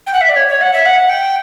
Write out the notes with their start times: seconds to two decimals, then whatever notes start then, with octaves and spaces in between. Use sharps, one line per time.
0.06 G5
0.13 F#5
0.21 E5
0.29 D5
0.36 C#5
0.48 C#5
0.61 F#5
0.73 E5
0.85 F#5
1.09 G5